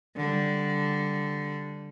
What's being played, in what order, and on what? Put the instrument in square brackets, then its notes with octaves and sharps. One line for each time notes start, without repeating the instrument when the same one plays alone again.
[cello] D3 G3